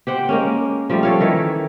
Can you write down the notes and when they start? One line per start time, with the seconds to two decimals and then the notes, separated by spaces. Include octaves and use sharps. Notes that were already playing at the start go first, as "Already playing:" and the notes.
0.07 G4 C5 F#5 G5
0.29 G#3 A#3 C#4
0.90 F3 G3 A3
1.03 A4 C#5 F5
1.20 D#3 E3 E4